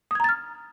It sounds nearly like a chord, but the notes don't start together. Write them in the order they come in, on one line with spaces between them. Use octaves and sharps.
D#6 G#6 A#5 A6 F6